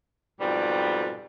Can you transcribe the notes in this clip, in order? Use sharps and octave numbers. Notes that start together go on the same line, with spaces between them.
F2 G#2 B2 G3